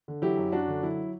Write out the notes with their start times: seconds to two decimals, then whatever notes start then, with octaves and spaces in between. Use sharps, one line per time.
0.08 D3
0.22 F#3 E4 G4
0.37 F#2
0.52 F#2 D4 F#4
0.68 D3
0.83 F#3 E4